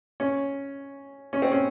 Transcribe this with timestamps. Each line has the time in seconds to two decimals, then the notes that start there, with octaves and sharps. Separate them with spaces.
0.20 C#4
1.33 C#4
1.42 C4
1.52 C#4